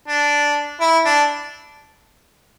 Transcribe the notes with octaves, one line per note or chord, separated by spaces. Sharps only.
D4
E4
D4